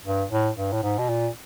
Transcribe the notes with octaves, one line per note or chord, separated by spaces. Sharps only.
G2
A2
G2
A2
G#2
B2
A#2